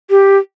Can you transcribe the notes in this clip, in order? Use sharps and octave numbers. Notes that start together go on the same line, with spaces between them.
G4